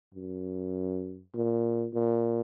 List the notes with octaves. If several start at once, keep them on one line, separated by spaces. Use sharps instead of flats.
F#2
A#2
A#2